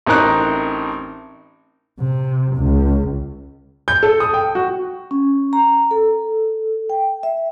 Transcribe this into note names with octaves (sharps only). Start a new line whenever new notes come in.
A1 C4 D#4 A#4 F#6
C3
C#2
G6
A4
D#6
G5
F#4
C#4
A#5
A4
G5
E5